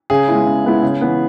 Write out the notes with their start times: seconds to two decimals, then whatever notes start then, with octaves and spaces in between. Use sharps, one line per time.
0.10 C#3 G#4
0.28 G#3 B3 E4
0.46 C#3
0.64 G#3 B3 E4
0.83 C#3
1.01 E3 B3